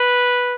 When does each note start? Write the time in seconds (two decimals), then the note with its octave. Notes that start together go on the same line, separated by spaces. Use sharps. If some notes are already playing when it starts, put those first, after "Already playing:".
Already playing: B4